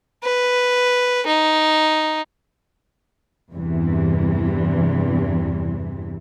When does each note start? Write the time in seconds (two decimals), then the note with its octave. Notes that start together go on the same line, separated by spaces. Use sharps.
0.23 B4
1.26 D#4
3.51 E2 G2 C3 E3